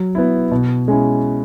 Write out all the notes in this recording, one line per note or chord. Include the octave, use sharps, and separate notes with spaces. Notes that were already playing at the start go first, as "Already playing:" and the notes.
Already playing: F#3
B3 E4
B2
G#3 C#4 E4